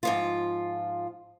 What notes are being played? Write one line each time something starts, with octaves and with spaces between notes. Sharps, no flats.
G#2 F3 F4